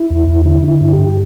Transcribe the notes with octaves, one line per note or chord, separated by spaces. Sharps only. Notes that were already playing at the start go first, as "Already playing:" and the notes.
Already playing: E4
E2
E2
D3 E4
D3
E4
G2
G4
G2